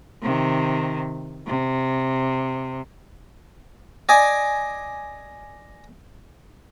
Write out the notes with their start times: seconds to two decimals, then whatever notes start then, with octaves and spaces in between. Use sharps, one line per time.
0.22 C3 D#3
1.47 C3
4.09 D5 D#5 G#5 D6